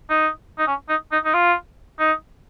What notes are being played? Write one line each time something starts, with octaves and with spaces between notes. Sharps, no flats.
D#4
D#4
C#4
D#4
D#4
D#4
F4
D#4